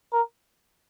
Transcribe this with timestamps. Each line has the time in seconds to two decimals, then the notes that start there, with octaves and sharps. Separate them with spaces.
0.13 A#4